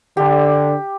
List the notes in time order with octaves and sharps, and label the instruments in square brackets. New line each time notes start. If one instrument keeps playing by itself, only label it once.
[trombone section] D3 [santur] G4